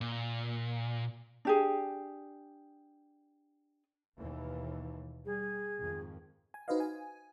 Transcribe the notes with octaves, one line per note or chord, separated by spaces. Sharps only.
A#2
D4 G4 G#4
D#2 B2 E3
G3 G#4
F2 G#2 D#3
G#5
D#4 F#4 B4 C5 D#5 F5
G#5